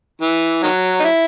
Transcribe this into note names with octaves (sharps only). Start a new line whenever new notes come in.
E3
D#3 F#3
D#4
E4